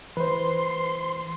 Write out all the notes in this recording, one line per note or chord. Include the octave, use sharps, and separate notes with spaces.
E3 B4 C5 C6